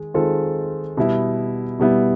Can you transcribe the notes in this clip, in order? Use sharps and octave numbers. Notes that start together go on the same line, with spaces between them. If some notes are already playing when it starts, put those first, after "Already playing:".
Already playing: D#3 G#3
D#3 G#3 C4 F4 A4
B2 G3 B3 E4
B2 G3 B3 E4